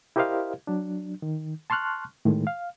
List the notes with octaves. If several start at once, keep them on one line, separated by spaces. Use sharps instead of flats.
E4 G4 A#4 C5 D#5 F5
F#3 D4
D#3
A5 C6 C#6 F6 F#6
A2 D#3 G#3
F5